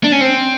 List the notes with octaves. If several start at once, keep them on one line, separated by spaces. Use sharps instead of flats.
D4
C#4
C4